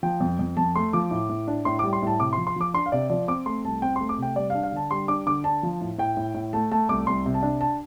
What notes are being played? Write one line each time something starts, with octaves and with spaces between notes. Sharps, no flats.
F3 G5
F2
F2
F2 A5
A3 C6
F3 D6
A2
A2
D4
A2 C6
G3 D6
C6
A2 A5
C3 D6
C6
F3
C6
F3 D6
D4 C6
F5
C3 D5
F3 D5
C4 D6
A3 C6
C2 A5
C4 G5
C6
A3
D6
C3 G5
G3 D5
F5
D4
F5
D3 A5
G3 C6
D4 D6
D3 D6
D4 A5
F3
A2
A2 G5
A2
A2
A3 A5
A3 A5
C2 D6
C2 C6
C3
A5
D4
A5